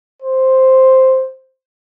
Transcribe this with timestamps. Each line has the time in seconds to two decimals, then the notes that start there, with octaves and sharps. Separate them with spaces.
0.22 C5